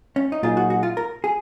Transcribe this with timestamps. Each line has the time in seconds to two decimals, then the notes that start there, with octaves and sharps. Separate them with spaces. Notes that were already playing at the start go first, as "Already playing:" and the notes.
0.16 C#4
0.32 D#4
0.43 A#2 F#3 A#3 D#4 F4 G#4
0.57 F#4
0.70 F#4
0.83 F4
0.97 A#4
1.24 G#4